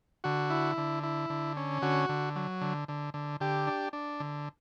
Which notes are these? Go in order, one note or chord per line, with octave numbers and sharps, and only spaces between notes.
D3 F#4
E4
D3
E4
D3
C#4
D3 F#4
D3
F#3
D3
D3
D3
D3 G4
D4
D4
D3